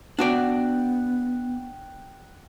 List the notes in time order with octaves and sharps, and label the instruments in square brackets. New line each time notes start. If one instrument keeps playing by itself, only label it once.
[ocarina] B3 [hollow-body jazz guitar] D4 F#4 D5 [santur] F#5 G5